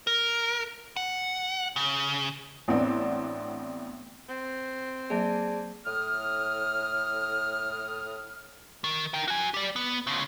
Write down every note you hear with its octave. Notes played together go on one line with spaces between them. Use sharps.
A#4
F#5
C#3
A1 B3 C4 D4
C4
F#3 A#3 G#4 D5 A5
A2 D#6 F6
D#3
A#4 G5
F#4 G#5
G4 D5
B3
D2 C#3